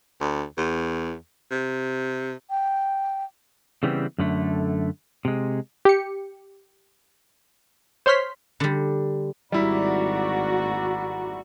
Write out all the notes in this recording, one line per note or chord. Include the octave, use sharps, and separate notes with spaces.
D2
E2
C3
G5
C#3 E3 G3 B3 C4
F#2 D3 A3
C3 G#3
G4 C#7
C5 C#5 C6 F6 B6
D3 G3
G#1 G3 E4 F#4 D5 A#5